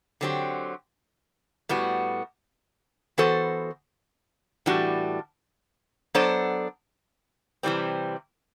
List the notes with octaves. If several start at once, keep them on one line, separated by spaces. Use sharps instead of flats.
D3 F#3 C4 G4
A2 G3 B3 F#4
E3 B3 F#4 A4 C5
A2 E3 G3 D4 F#4
F#3 B3 D4 A4 C5
C3 E3 G3 C4